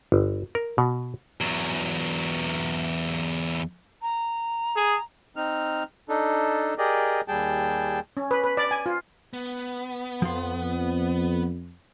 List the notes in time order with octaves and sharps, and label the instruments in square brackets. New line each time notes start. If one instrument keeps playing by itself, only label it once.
[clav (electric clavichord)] G1
A#4
B2
[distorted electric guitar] E2 F#3
[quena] A#5
[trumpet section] G#4
[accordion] C4 D#4 F6
D4 D#4 A4
G4 G#4 A#4 D5 D#5
D#2 G3 G#4 G5 A5
[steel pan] C#4
B4
B4
D5
G#5
F4
[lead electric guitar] B3
[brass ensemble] F2 [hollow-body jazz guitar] F3 C6